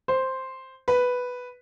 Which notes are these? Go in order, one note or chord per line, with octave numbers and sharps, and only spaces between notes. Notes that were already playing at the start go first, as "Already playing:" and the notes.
C5
B4